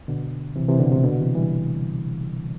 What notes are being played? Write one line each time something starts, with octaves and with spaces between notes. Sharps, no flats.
B2 D3
C3 E3
C3 E3
B2 D3
A2 C3
B2 D3
C3 E3
E3 G3